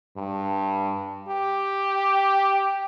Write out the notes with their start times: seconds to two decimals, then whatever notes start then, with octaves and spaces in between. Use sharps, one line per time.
0.16 G2
1.29 G4